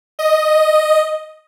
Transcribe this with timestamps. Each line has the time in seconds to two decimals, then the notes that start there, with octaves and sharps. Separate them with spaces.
0.19 D#5